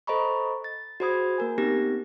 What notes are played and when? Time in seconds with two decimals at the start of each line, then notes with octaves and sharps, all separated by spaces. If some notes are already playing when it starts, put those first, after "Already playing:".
0.07 A4 C5 D#5 A#5 B5 C#6
0.64 A6
1.00 F#4 G#4 C5 B5 D#6 G#6
1.38 A#3 A#4 G#5
1.58 B3 C4 D#4 G4 A#6